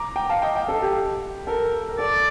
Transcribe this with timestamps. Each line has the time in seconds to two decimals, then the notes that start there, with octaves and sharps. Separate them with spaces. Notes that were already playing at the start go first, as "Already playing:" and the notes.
Already playing: A#5 D6
0.16 G5 A#5
0.29 F5 A5
0.42 D#5 G5
0.55 D#5 G5
0.68 A4
0.82 G4
1.47 A4 A#4
1.89 A#4
1.98 A4 D5